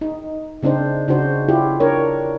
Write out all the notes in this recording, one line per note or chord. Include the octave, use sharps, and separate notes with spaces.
D#4
C#3 C4 D4 D#4 C5
C#3 D4 D#4 F#4 C5
E4 F4 G4
D4 A#4 C#5